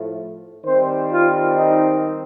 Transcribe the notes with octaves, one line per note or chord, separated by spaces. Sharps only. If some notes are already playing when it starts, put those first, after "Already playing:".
Already playing: A2 F3 A3
D#3 G3 C4 C5
F4
D#4